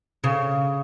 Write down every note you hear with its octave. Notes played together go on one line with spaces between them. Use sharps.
C#3